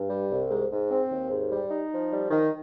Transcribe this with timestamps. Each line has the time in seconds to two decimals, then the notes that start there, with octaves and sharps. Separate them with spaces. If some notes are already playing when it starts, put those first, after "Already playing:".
Already playing: G2
0.10 G3
0.30 C2
0.50 G#2
0.70 G#2
0.90 C4
1.10 D#2
1.30 G#2
1.51 G3
1.70 D#4
1.91 F3
2.10 G3
2.31 D#3